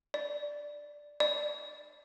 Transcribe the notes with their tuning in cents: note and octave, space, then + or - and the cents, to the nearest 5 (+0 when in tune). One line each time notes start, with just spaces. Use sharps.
D5 +0
D5 +10